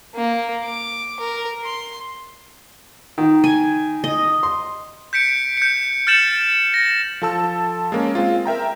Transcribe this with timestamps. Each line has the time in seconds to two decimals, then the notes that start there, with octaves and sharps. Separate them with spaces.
0.15 A#3
0.65 D6
1.20 A#4
1.64 C6
3.18 D#3
3.44 G#5
4.04 D#5
4.43 C6
5.13 G6 B6 C#7 D7
5.57 G6 C#7
6.07 F6 G6 A6 C#7 E7 F#7
6.74 A#6
7.22 F3 A4 A5 E6
7.92 G#3 A#3 C#4
8.15 G#3 C4 F4
8.46 A#4 E5 G5 A#5